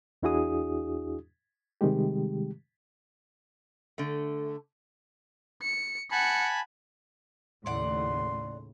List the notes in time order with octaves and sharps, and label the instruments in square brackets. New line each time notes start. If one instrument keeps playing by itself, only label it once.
[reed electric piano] E2 D4 E4 F#4 G#4 D#6
C3 D#3 G3 G#3 G4
[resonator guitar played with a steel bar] D3 A3
[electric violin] C#7
[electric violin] F#5 C#7 [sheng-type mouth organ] G#5 A5 B5
[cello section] D#2 A2 C#3 [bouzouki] D5 F#5 [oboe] C6